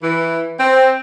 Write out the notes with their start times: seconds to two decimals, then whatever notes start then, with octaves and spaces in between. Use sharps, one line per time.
0.03 E3
0.58 C4